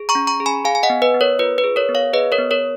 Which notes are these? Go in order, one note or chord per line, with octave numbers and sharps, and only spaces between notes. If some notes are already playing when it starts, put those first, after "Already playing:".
Already playing: G#4
A#5 C#6
C#4
A#5 C#6
G#4
G#5 B5
G#4 F5 G#5
G#5
D#5 F#5
B3
B4 D#5
B3
A#4 C#5
F4 B4
B4
G#4
A#4 C#5
B3
C#5 F5
G#4 B4 D#5
A#4 C#5
B3
A#4 C#5